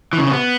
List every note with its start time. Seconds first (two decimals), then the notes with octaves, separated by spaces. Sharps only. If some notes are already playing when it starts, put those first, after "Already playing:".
0.13 E3
0.18 C#3
0.27 C#4
0.31 B3